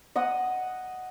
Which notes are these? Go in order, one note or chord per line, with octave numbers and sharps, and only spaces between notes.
D#5 F#5 D#6